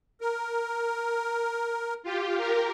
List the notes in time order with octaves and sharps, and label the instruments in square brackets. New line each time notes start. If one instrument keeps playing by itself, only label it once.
[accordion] A#4
[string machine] F4 G4
G4 A#4